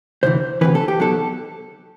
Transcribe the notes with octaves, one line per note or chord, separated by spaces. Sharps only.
D2 C3 E3 C5
D2 C3 E3 B4
A4
G4
B1 B2 F#3 A4